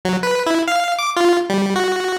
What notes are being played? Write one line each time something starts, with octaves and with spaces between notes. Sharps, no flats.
F#3
B4
E4
F5
D6
F4
G3
F#4